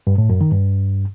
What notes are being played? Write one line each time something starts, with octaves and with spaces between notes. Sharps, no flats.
G2
A2
F#2
D#3
G2